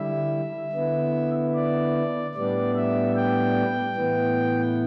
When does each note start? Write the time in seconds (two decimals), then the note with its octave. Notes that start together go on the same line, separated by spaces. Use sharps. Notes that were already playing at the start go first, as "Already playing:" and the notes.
Already playing: D3 G3 E4 E5
0.73 D3 B3 E4
1.54 D5
2.34 A2 G3 B3 D4 D5
2.75 E5
3.16 G5
3.96 A2 E3 B3